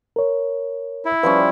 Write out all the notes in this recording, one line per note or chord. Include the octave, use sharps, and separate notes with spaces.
A#4 C#5
E4
F3 G3 C#4 B4